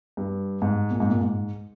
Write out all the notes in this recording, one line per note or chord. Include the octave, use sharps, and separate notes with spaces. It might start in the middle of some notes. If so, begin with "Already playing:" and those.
G2
G#2
A#2
G#2
A#2
G#2